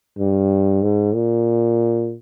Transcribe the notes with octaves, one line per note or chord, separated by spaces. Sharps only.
G2
G#2
A#2